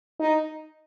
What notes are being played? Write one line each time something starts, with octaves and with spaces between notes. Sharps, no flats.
D#4